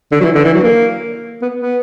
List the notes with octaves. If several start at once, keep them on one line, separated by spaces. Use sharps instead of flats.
D3
F#3
E3
D3
E3
F#3
A#3
B3
B3